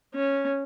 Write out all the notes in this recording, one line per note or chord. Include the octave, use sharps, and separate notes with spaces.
C#4